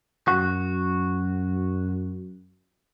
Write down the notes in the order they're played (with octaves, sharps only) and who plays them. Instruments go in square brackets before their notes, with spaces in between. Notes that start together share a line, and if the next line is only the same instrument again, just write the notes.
[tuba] F#2 [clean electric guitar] F#4